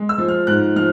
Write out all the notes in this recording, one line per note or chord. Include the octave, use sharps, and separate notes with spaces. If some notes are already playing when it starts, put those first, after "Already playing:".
Already playing: G#3
E6
F3
F6
G#2 F#6
F3 F6